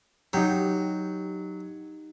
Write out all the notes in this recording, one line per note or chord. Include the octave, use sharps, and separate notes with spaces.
F#3 D#4 G4